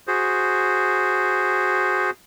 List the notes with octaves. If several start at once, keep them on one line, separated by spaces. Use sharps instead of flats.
F#4 G#4 C5